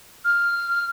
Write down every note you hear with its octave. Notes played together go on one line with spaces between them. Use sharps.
F6